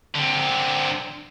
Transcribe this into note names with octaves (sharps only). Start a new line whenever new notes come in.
D3 C4